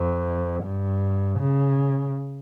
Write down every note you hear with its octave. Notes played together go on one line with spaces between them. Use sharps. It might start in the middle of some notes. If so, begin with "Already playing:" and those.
Already playing: F2
G2
C#3